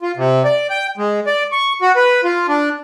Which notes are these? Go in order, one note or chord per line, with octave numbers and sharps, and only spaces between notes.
F4
C3
D5
G5
G#3
D5
C#6
F#4
B4
F4
D4